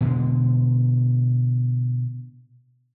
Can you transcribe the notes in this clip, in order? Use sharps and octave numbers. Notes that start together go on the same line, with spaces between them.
B2 D3 G#3